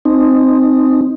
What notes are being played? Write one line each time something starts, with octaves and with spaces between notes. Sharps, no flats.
C4 D#4